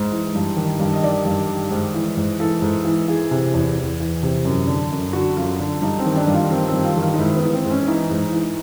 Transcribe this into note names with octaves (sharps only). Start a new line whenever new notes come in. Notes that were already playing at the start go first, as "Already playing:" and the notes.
Already playing: G#2
E3
G2
D#3
G2
D#5
D#3 D5
G2
D#3
G#2
E3
G#2
E3 A4
G#2
E3
E3 G#4
C3
E2
E2
E3
C3
F#2
D3
F#2
D3 F#4
F#2 F4
D3
G2 D#4
C4
D#3
D4
G2
F4
D#3 C4
G2 C4
F4
D#3
F4
D#4
G#2 E4
B3
E3
C4
G#2
C#4
E3 D#4
G#2
E3